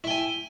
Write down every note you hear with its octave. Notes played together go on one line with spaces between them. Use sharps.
E4 G5 G#5